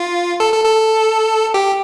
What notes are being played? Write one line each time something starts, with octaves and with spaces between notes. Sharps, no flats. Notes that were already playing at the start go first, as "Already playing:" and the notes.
Already playing: F4
A4
A4
A4
G4